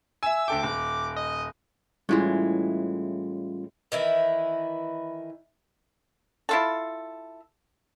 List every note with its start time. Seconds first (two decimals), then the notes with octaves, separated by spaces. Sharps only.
0.23 E5 G#5 E6
0.48 D2 A4 G5 D6
0.63 D#1
1.16 D#5
2.09 A2 E3 G3 G#3 C#4 F4
3.92 D#3 E3 E4
6.49 E4 F4 A4